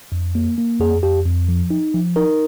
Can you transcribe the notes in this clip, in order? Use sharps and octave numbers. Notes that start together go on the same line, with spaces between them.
F2
A#3
A#3
F2 G#4
F2 G4
F2
F3
D#4
F3
D#4 A#4